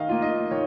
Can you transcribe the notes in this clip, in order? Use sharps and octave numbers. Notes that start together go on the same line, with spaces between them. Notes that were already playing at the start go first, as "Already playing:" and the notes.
Already playing: D#3 D#5 F5
A#3 F4
D#5
D#3 C#5